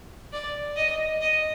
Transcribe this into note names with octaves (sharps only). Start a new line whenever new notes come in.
D5
D#5
D#5